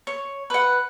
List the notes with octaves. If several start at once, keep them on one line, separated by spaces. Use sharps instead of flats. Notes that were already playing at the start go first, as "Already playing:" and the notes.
C#5
B4 F#5